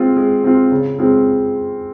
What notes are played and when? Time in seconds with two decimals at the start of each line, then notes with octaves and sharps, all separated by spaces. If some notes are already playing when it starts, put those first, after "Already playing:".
Already playing: G#3 C4 F4
0.16 G#3
0.44 C4 F4
0.71 C#3
0.98 G#3 C4 F4